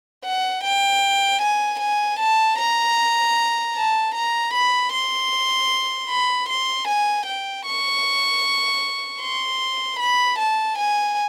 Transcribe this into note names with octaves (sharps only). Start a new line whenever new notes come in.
F#5
G5
G#5
G#5
A5
A#5
A5
A#5
B5
C6
B5
C6
G#5
G5
C#6
C6
B5
A5
G#5